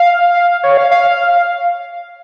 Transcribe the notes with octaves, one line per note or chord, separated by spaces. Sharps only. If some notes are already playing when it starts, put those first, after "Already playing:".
Already playing: F5
C#5
F5
F5